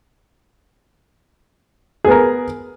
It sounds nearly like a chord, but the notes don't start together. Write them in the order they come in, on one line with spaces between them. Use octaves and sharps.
G#4 B3 A#4